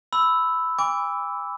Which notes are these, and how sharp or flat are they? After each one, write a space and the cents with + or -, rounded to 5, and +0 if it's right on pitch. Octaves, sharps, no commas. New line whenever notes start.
B5 +15 E6 -5
G#5 -45 B5 +25 D6 -25